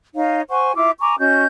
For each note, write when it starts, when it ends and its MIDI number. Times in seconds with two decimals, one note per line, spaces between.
0.15 0.42 63
0.15 0.42 73
0.15 0.42 77
0.49 0.72 72
0.49 0.72 78
0.49 0.72 80
0.49 0.72 85
0.75 0.91 64
0.75 0.91 65
0.75 0.91 76
0.75 0.91 86
1.00 1.15 80
1.00 1.15 82
1.00 1.15 85
1.00 1.15 86
1.18 1.45 61
1.18 1.45 66
1.18 1.45 75
1.18 1.45 91